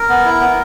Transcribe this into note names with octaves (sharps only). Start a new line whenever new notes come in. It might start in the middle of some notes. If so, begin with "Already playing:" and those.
Already playing: A#4
B3
E4
B3